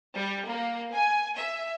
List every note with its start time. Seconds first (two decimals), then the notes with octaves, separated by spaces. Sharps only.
0.16 G3
0.49 A#3
0.94 G#5
1.37 E5